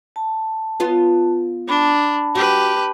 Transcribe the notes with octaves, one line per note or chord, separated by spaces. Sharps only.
A5
B3 F4
D4 A5 B5
F#4 G4 B4